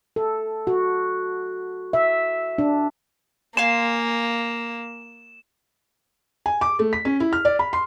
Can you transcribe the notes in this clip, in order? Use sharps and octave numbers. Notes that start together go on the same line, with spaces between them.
A4
F#4
E5
D4
A#3 F5 G#5 C6 E7
G#5
D6
A3
B6
C#4
E4
F6
D5
B5
C6